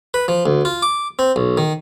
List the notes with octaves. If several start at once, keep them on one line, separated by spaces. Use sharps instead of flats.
B4
F3
D2
F4
D6
C4
B1
D#3